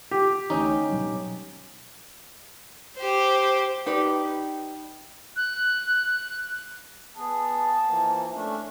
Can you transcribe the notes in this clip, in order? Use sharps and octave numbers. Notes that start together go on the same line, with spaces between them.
G4
D2 E3 C#4 D#4
B2 F#3 G3
G4 C5
D#4 G4 B4 D5
F#6
B3 G#4 A5
E3 F3 A#3
A3 C#4 D4